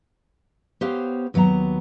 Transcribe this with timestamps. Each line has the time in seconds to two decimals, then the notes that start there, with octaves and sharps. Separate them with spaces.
0.81 B3 G4 C5 C#5 F5
1.34 D#2 F#3 B3 F5 A#5